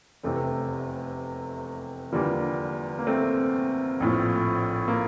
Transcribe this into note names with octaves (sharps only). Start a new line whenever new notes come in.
F1 E2 C3 A3 C4
E2 D3 F3 G3 A#3
A#3
A3 C4
A#1 A2 F3
A#3